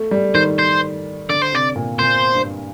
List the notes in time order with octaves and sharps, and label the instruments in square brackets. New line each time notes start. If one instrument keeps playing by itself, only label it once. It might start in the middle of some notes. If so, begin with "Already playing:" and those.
Already playing: [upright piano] A3
G3
[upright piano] D#3 [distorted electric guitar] C5
[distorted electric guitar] C5
[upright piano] D3 [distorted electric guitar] D5
[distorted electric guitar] C5
[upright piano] C3 [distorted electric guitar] D5
[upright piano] A#2
[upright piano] A#2 [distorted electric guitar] C5
[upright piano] G2